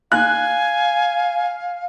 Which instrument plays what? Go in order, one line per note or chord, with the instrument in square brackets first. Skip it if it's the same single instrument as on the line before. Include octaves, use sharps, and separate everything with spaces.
[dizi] F5 [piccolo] G#5 [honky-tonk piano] F#6